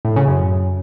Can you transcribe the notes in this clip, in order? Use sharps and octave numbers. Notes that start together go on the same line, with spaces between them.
A2
C#3
F#2